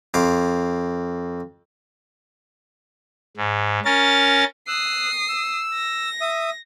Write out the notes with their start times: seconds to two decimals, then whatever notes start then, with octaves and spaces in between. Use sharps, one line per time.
0.14 F2 F5 D6
3.37 G#2
3.85 C#4 A#4 A6
4.68 D#6 E6 F#6 C7
5.29 E6
5.74 A#6
6.21 E5 D#6